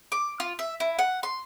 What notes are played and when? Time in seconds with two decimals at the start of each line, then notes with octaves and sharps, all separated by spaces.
0.12 D6
0.40 F4
0.59 E5
0.80 E4
0.99 F#5
1.23 C6